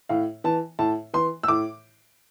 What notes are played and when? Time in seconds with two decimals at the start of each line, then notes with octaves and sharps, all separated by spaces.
0.09 A2 F5
0.44 E3 A5
0.79 A2 A5
1.14 E3 C6
1.43 E6
1.48 A2 D6